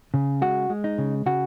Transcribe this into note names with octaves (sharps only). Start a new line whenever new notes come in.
C#3
G#3 F#4
G#3
D#4
C#3
C#3 F#4